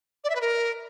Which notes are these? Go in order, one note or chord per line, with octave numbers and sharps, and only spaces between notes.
D5
E5
B4
A#4